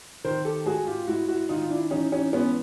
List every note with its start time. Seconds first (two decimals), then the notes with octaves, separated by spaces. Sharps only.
0.24 D#3 A#4 C5
0.45 G4 A4
0.66 G#2 F#4 G#4
0.86 F4 G4
1.07 G#2 E4 F#4
1.28 E4 F#4
1.49 D#3 D#4 F4
1.64 F4
1.70 D4 E4
1.91 E3 C#4 D#4
2.12 C#4 D#4
2.32 G#2 B3 C#4